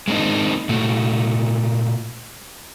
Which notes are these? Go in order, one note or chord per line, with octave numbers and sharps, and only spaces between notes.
G#3 A#3 C4 D4 D#4
A#2 A3 F#4